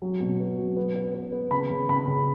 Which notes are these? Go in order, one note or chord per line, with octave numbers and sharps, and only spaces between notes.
F#3
B2
B3
F#3
B3
B3
B3
B3
C#3 B5
C#3
C#3 B5
C#3